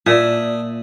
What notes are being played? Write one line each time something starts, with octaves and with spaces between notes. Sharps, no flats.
A#2 D4 E5 D#6